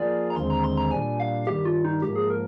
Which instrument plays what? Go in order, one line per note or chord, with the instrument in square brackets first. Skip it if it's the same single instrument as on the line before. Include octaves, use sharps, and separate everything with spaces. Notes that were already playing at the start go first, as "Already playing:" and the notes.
Already playing: [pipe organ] F3 A#3 F4 G#4 [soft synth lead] D5
[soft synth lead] A#5
[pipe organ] D#2 D3 G#3 C4 [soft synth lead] C6
[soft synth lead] A#5
C6
A#5
[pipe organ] A#2 G3 D4 [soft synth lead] G#5
[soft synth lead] F5
[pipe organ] G2 D#3 G3 [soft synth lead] G4
[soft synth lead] F4
D#4
[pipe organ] G#2 F3 A#3 [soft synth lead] G4
[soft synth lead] G#4
A#4